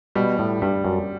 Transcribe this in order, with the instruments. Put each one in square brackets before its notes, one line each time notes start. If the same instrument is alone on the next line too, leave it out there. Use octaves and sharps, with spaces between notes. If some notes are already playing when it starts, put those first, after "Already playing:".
[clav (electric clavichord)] B2 [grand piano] G3
[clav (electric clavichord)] A2
[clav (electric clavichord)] G2 [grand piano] G3
[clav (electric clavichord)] F#2